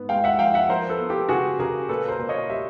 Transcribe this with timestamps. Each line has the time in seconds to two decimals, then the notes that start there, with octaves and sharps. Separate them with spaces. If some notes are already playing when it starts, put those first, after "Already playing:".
Already playing: G#2 B3
0.09 G#3 F5 G5
0.24 E5 F#5
0.39 F3 F5 G5
0.54 E5 F#5
0.69 F3 A#4 C5
0.89 A4 B4
0.99 B3
1.09 G4 A4
1.29 C#3 F#4 G#4
1.59 C#3 G#4 A#4
1.89 A#2 A4 B4
2.09 A#4 C5
2.19 A#2
2.29 C#5 D#5
2.49 G3 E5